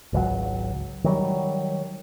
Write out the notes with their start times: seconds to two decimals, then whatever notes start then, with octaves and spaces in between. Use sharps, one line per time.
0.13 G#1 C#2 F#3
1.04 D#3 F#3 G3